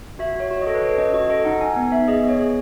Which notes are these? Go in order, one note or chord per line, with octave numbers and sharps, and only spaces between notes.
F#4 E5
F#4 C#5
F#4
C#5
D#5
A4
B4
A4 C#5
C#4 D#5
F#4 D#5
A4 D#5
D#4 F#5
D#4 G#5
B3
B3 E5
G#4 D#5
B3
C#5
G#4